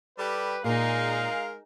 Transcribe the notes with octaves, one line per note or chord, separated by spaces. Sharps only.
G3 G4 A4 B4
A#2 G#3 D#4 G#4 A#4 F5